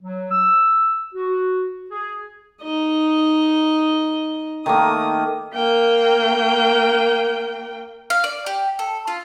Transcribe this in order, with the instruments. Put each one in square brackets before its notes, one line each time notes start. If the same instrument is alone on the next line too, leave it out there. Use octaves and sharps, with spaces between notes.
[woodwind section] F#3
E6
F#4
G#4
[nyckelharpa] D#4 D#5
[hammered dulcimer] D#3 A3 A#3 [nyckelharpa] D#6
[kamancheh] A#3 G5
[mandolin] F5
D5
G4
A4
F4